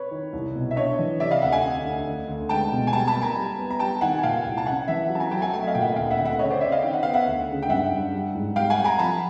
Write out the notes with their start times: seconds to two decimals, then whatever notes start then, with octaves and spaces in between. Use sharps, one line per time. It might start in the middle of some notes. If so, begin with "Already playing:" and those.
Already playing: B4 C#5
0.11 D#3
0.33 C2
0.55 B2
0.71 E5
0.76 D4 C#5 D#5
0.99 E3
1.20 C3 D5 E5
1.31 D#5 F5
1.42 D2 E5 F#5
1.52 F#5 G#5
1.63 D2
1.85 D2
2.06 D2
2.28 D2
2.49 G#3 G5 A5
2.72 B2
2.87 G#5
2.93 G3 G5 A5
3.07 A5 B5
3.15 A#3
3.22 G#5 A#5
3.37 G3
3.59 B3
3.70 A#5
3.79 G3 G5 A5
4.01 D#3 F#5 G#5
4.18 G#5
4.23 A#2 F5 G5
4.45 C2
4.57 A5
4.66 C#4 F#5 G#5
4.88 E3 E5 F#5
5.10 F#3
5.15 A5
5.20 G#5 A#5
5.31 F#3 G5 A5
5.42 F#5 G#5
5.53 A3 F#5 G#5
5.63 E5
5.67 D#5 F5
5.75 A#2 G5
5.81 E5 F#5
5.93 F#5
5.96 D2 F5 G5
6.11 E5 F#5
6.18 D2
6.25 E5 F#5
6.39 C#3 C#5 D#5
6.50 C5 D5
6.61 C#3 D5 E5
6.72 D#5 F5
6.82 D#3 G5
6.93 F#5
7.03 B3 F5
7.13 E5 F#5
7.26 D2
7.48 C#3
7.62 G5
7.69 G2 E5 F#5
7.92 G2
8.12 G3
8.35 G#2
8.55 G3 F5 G5
8.70 F#5 G#5
8.78 G3
8.84 G#5 A#5
8.99 F3 A5 B5